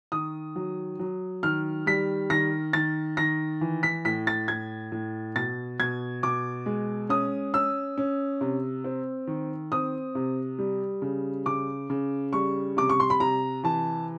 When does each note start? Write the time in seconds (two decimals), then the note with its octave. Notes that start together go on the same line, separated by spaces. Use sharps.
0.12 D#3 D#6
0.56 F#3
0.99 F#3
1.43 D#3 F6
1.86 G3 B6
2.30 D#3 A#6
2.73 D#3 A6
3.17 D#3 A#6
3.61 E3
3.83 B6
4.05 A2 B6
4.27 A6
4.48 A2 G#6
4.92 A2
5.36 B2 A6
5.80 B2 G#6
6.23 B2 D6
6.66 G#3
7.09 C#4 D#6
7.54 C#4 E6
7.98 C#4
8.41 C3
8.84 C4
9.27 D#3
9.72 C4 D#6
10.15 C3
10.59 G3
11.02 C#3
11.46 C#3 D6
11.90 C#3
12.33 G3 C#6
12.77 C3 D6
12.89 C#6
13.00 C6
13.10 B5
13.20 C3 A#5
13.64 E3 A5